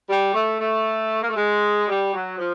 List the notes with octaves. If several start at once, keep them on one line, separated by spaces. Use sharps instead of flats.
G3
A3
A3
A#3
A3
G#3
G3
F#3
F3